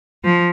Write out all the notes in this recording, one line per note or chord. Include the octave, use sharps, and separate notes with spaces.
F3